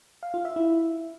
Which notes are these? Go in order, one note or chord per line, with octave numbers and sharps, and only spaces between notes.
F5
F4
E5
E4